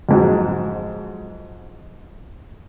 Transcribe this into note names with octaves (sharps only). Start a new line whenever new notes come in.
F2 G#2 F#3